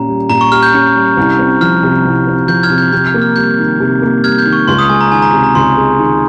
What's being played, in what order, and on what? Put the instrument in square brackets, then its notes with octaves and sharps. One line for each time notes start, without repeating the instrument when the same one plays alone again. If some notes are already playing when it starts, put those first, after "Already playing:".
Already playing: [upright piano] A#2 C#4 G4 [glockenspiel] A#5
[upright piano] G3
[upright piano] A#2 [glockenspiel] A#5
[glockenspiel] C#6
[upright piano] G4 [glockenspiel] F6
[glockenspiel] G6
[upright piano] C#4
G3
C2
C4
[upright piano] F3 [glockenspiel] F6
[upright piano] C3
C2
C4
[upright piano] F3 [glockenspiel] G6
[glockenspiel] F6 G#6
[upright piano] C3
[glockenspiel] G6
[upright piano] C3 [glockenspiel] G6
[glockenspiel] F6
[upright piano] A#3
[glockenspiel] F6
[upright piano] G3 [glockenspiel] G6
[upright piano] D#3
C3
A#3
[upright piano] G3 [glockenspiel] F6 G#6
[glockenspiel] G6
[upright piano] D#3
[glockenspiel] C#6
[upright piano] C#2 [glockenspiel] C6
[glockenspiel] D#6
[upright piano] G#3 [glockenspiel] G#5
[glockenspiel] A#5
[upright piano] D#3 [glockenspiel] G#5
[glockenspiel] A#5
[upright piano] C3
[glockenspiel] A#5
[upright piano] C#2 [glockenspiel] C6
[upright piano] G#3
D#3